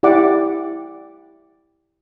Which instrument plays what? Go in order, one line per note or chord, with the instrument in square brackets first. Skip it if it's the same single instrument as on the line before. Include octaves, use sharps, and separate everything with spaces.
[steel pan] E4 G4 D5 F#5 D6